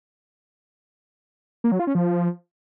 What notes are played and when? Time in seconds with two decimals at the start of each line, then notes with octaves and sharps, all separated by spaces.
1.64 A#3
1.72 F#3
1.79 F4
1.87 C#4
1.95 F3